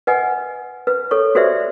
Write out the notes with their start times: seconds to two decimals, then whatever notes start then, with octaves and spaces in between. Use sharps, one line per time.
0.07 B4 D#5 F#5 G#5
0.87 B4
1.11 A4 C#5 C#6
1.35 F#4 G4 B4 C5 D5 E5